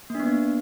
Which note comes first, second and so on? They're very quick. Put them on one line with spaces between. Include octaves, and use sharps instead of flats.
A#3 D4 B3